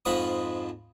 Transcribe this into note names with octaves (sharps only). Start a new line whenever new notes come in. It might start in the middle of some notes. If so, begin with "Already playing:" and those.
F2 G#2 F3 B5 C#6 D#6